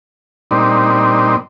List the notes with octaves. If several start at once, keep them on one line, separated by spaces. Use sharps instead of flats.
A#2 G3 C4 D4 D#4